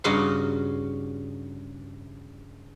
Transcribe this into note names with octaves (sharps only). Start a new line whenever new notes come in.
G2 C#3 D#4 F#4 F5 C6